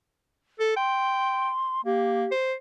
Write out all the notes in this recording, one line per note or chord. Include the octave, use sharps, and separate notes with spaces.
A4
G5 C6
A#3 G4
C5